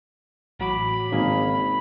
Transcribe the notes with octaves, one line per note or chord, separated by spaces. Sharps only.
A1 F#3 B5 D6
G#1 C#3 A#3 G#4